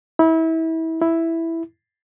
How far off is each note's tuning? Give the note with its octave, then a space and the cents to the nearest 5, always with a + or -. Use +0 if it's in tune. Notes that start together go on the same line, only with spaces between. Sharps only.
E4 -30
E4 +0